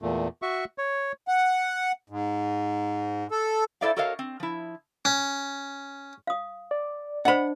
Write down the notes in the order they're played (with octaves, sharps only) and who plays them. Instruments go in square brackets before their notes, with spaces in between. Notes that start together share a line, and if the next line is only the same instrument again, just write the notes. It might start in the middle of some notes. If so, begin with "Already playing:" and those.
[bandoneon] E2 A#2 A3
F#4 E5 C#6
C#5
[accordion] F#5
G#2
A4
[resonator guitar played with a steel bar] E4 A4 C5 D5 E5 F5
F#4 A4 A#4 C#5 D#5 F5
C4
F3 E4
[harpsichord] C#4
[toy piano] F5 D#6
[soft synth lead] D5
[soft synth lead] D4 [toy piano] C5 D#5 [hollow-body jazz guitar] F#5 B5